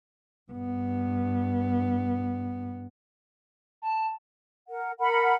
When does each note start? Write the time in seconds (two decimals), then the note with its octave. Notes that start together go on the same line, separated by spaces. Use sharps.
0.52 G2 B3
3.82 A5
4.68 A#4 F#5
4.99 A#4 F#5 B5